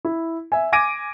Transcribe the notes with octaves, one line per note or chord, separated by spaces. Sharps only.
E4
E5 G#5
G#5 D6 G#6 A#6 D7 D#7